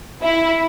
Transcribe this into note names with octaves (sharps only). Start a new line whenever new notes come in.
E4